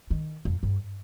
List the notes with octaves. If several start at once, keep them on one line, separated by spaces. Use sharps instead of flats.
D#3
F2
G2